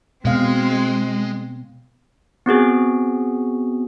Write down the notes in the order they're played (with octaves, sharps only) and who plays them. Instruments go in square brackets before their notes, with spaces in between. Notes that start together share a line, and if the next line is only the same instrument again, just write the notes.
[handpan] B2 F5 [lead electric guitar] G#3 [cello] C4
[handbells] B3 C4 F#4 G#4